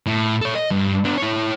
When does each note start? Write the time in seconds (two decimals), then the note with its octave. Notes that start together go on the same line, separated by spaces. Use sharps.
0.06 A2
0.41 A4 C#5
0.55 D#5
0.71 G2
1.05 B3 D4
1.18 E4 C#5